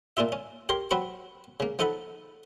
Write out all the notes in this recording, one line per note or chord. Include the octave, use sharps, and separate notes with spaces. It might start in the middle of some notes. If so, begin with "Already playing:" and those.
A#2 A#3 D4 F4 E5
C#4
G4 A#4 C#5 C6
F#3 C4 F#4 B4 B5 C#6
C#3 A#3
F3 D#4 A4 F#5 B5